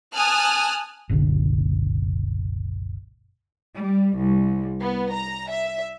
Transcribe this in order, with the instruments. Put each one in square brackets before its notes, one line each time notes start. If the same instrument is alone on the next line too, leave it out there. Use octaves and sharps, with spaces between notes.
[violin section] G#5 A5 D#6 F6 F#6
[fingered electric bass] F#1 C2 A#2 D3
[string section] G3
C2
B3
A#5
E5